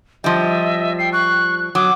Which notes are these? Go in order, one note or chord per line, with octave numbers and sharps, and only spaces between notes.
F3 G3 D#5 E5
G5 C7
C#6 F#6
F#3 D6 D#6